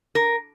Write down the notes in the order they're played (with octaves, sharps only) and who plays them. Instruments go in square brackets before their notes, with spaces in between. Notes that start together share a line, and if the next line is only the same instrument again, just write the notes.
[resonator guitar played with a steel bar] A#4